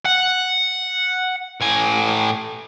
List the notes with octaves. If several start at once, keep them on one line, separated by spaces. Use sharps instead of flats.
F#5
A2 G#5